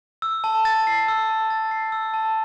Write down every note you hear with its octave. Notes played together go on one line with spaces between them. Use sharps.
E6
A5
A6
C7
E6
A5
A6
C7
E6
A5